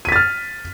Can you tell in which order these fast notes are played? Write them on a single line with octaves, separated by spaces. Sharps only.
D#7 B6 A6 F6